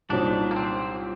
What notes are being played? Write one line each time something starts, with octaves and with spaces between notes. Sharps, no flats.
C2 A#2 F#3 C4 D4 D#4
A#3
C4